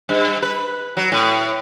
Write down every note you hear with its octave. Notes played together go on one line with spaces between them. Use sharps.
G2
B4
F#3
A2